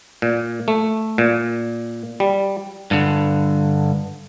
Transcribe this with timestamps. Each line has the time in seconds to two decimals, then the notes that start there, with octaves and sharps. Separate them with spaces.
0.22 A#2
0.68 A3
1.18 A#2
2.20 G3
2.91 G2 D3